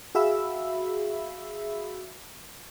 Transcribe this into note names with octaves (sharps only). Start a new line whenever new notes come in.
F#4 G#4 E5 F5 B5 E6